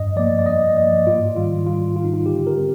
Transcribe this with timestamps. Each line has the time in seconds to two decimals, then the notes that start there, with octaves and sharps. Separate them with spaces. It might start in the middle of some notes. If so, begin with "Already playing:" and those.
Already playing: G2 D#5
0.16 F3 A#3 D5
0.39 D5
0.46 G2 D#5
0.76 F3 A#3 D5
1.07 G#2 F4
1.36 D#3 G3 F4
1.66 G#2 F4
1.96 D#3 G3 F4
2.04 D#4
2.14 F4
2.26 D3 G4
2.47 A#4
2.57 G3 C4